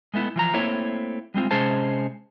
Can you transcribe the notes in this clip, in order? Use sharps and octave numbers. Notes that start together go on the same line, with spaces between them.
G#3 A3 B3 E4
E3 F3 A#5
A3 A#3 C4 E4 C#5
G3 G#3 C4 F4
C3 G#3 C#4 G#4 C5 A5